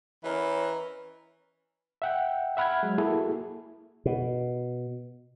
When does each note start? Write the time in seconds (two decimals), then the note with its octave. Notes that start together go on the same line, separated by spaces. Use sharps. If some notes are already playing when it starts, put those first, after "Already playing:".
0.24 E3 C#4 A#4 B4 C#5 D#5 A#5
2.02 E5 F#5 G5
2.57 E5 F#5 B5 F6 F#6 G#6
2.83 F#3 G#3
2.98 A#3 E4 F#4 G#4 A4
4.06 B2